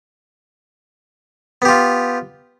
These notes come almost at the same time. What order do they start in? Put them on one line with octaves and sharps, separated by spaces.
B3 G4 F4